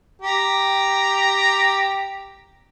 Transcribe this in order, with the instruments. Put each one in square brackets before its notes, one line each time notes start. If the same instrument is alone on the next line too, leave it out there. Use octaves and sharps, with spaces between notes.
[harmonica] G4 A#5